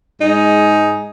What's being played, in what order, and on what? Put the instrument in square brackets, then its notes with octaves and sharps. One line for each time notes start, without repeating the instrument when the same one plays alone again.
[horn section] G#2 G#3 D#4 G#4